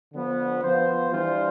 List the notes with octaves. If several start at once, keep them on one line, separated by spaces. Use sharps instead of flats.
D3 F3 B3
F3 B3 F4 C5
E3 G3 D4 F4 C5